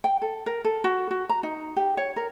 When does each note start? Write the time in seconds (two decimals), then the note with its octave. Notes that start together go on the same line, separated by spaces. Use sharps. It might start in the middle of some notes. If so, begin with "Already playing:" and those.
0.04 G5
0.22 A4
0.46 A#4
0.64 A4
0.84 F#4
1.11 F#4
1.29 A#5
1.43 D#4
1.76 G4
1.97 C#5
2.16 A#4